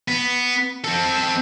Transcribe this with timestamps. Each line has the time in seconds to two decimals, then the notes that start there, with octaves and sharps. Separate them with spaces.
0.08 B3
0.84 C4 A4